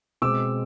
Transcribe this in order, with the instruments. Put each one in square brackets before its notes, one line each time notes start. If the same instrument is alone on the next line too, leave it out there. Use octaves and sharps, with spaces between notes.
[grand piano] B2 G#3 C4 D6 E6